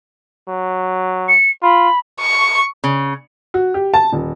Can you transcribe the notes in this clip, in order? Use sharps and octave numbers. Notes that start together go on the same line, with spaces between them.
F#3
C#7
F4 B5
C#6
C#3
F#4
G4
A5
D#1